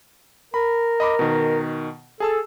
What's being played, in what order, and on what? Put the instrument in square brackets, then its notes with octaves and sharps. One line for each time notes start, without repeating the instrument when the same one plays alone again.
[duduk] A#4 [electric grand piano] B5
[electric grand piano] D#5 B5 D6
B2 D#3
[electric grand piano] G#4 A5 E6 [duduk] A4